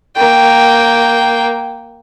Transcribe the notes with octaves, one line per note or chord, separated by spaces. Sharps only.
A#3 G5